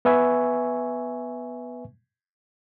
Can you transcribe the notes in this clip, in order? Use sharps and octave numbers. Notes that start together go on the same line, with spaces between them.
B3 B4 E5 G#5 C#6